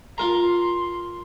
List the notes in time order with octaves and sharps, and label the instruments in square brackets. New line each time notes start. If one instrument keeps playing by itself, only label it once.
[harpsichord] F4 A#4 A#5 [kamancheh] C6